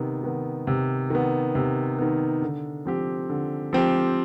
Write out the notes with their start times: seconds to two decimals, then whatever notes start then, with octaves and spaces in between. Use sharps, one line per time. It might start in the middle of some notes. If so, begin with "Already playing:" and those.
Already playing: C3 D#3 B3
0.24 D#3 B3
0.67 C3
1.10 D#3 B3
1.55 C3
1.99 D#3 B3
2.42 D3
2.85 F3 C4 G4
3.29 D3
3.73 F3 C4 G4